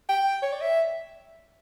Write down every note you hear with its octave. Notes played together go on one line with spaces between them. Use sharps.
G5
C#5
D5
E5